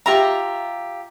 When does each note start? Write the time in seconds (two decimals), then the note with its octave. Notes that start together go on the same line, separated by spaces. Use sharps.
0.06 F4 G4 E5 A#5